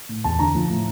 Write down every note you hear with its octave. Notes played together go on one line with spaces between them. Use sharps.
A2
E2 A5
D3 A#5
F3
A2